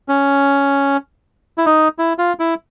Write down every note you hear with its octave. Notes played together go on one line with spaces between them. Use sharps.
C#4
E4
D#4
E4
F4
E4